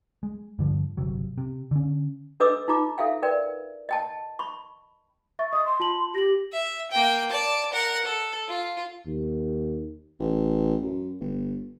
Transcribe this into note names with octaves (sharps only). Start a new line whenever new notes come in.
G#3
G2 D3 F3
G1 C2 C3 F#3
C3
D3 C#4
D4 A4 B4 D#5 D6 E6
D#4 F4 A#5 D6
A4 E5 F5 G5
A#4 B4 D5 G5
D#5 G5 A5
B5 C#6
E5 C#6 A6
D#5 D#6
C6
F4 A5 F#7
G4 A#6 F#7
E5
A#3 G5
D5 A5
A#4 F#5
A4
F4
D#2
A1
F#2
G1